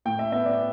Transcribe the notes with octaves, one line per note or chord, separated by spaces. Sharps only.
A2 G5
E5
B3 E5
D5